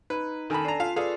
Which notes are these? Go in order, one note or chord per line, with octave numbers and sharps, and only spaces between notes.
D#4 B4
D#3 A4 G#5 A5 B5
D4 A#5 C7
F4 F5
G#4 A4 B4 D5 F5